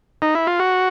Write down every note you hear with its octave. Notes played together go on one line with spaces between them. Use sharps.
D#4
E4
F4
F#4